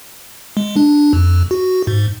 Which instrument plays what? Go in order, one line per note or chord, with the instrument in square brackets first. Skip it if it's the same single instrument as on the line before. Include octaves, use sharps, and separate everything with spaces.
[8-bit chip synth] G#3
D4
F2
F#4
G#2